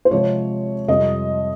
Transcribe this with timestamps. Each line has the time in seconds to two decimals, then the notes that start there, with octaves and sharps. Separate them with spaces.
0.05 C5
0.11 C3 F3 G#3 C#5
0.88 F2 C3 G3 D#5